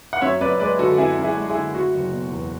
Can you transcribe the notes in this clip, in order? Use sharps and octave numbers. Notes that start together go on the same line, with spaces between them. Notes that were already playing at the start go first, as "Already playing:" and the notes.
F#5
F#2 C#5 E5
F#2 B4 D5
G#3 B4 D5
D3 F#4 A4
F#2 E4 G#4
F#2
E4 G#4
G#3
E4 G#4
D3
A3 F#4
F#1
B2
E2